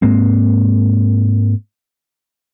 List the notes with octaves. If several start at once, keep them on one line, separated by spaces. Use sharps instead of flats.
G#2 G#3 A#3 C4